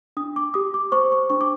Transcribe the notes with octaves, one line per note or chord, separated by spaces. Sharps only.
D4 D#6
D6
G4 D#6
D6
C5 C#6
C#6
D4 C#6
D6